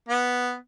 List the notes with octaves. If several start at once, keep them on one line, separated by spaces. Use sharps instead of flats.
B3